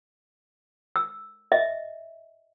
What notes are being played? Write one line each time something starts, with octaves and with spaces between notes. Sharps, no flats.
E6
D#5 E5